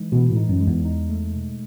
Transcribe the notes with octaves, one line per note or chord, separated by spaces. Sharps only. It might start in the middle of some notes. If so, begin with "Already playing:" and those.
Already playing: E3 G#3 D#4
B2 E3
A2
D#4
F#2
G#3
E2
D#4
A3
B2